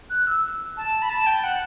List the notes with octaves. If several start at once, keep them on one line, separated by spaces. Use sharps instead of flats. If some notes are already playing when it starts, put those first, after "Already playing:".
F#6
E6
A5
B5
A5
G5
F#5